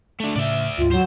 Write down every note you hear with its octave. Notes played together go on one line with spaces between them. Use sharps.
A3 D4
A2 C#3 D5 E5
D2 G#2 F4
F#3 C5